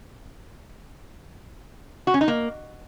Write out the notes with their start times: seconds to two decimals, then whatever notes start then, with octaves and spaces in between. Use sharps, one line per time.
2.07 F#4
2.14 C#4
2.21 D#4
2.28 A#3